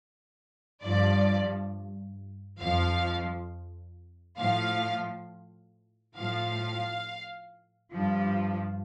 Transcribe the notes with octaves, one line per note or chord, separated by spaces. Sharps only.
G2 F3 D5
F2 F3 F5
A2 F3 F5
A2 F3 F5
G2 F3